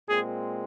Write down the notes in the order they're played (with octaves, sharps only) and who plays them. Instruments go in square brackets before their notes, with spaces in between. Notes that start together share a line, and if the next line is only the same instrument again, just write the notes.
[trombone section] A#2 G#3 C4 G#4